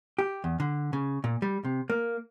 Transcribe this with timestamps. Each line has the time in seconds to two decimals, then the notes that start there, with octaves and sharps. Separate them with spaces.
0.19 G4
0.44 E2
0.60 D3
0.93 C#3
1.24 A#2
1.42 G3
1.65 C3
1.90 A#3